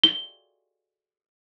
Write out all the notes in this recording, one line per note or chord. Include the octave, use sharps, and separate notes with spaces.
G7